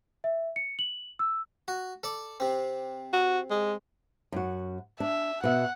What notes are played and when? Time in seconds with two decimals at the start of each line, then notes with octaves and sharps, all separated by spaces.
0.24 E5
0.56 C#7
0.79 F#7
1.19 E6
1.68 F#4
2.03 A4 D5 D6
2.40 C3 C4
3.13 F#4
3.50 G#3
4.32 F#2 F#4
5.00 D4 E5
5.44 B2 E5 F#5